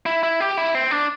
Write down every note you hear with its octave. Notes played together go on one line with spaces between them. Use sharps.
E4
E4
G4
E4
C4
D4